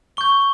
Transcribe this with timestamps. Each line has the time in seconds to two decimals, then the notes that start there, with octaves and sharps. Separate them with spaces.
0.17 C#6 G6 G7